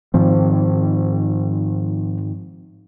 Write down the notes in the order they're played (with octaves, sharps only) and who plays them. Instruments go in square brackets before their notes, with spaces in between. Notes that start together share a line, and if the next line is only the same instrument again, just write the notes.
[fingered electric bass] G#2 D#3 C4 [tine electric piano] F3